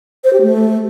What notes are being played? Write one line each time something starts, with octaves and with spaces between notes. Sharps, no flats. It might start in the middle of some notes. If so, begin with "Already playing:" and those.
C5
G4
A3